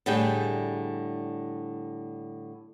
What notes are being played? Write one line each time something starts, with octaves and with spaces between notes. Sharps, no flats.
A2 D3 G3 G#4 G5